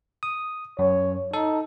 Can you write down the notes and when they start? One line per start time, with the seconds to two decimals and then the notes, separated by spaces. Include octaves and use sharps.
0.23 D#6
0.79 F#2 C#5
1.34 D#4 A4